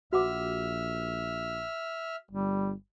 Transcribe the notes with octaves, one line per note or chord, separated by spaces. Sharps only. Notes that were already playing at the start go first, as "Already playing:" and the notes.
A#1 F#4 E5 F#5 D6 F6
G1 G3